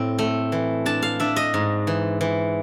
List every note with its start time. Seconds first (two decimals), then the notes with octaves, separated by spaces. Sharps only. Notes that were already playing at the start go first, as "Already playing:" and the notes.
Already playing: A2 C4
0.19 A3
0.52 E3
0.86 D4 A5
1.02 F5
1.20 D4 E5
1.36 D#5
1.54 G#2
1.87 E3
2.21 E3